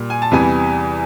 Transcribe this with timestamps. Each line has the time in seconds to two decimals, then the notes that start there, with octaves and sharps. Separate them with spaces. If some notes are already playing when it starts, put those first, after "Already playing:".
Already playing: A#2 G3
0.10 G#5
0.22 A5
0.31 E2 C3 E3 G3 G#5